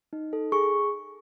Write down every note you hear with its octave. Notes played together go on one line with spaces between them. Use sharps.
D#4
A4
G#4 C#6